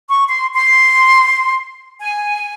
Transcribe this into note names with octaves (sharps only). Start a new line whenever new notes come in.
C#6
C6
C6
G#5